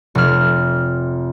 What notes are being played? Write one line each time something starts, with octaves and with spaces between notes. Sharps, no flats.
F1 F6